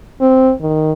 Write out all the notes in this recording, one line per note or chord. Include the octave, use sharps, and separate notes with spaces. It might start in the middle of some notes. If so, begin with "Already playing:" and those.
C4
D#3